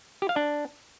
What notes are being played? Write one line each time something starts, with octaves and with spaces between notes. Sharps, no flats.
G4
F5
D4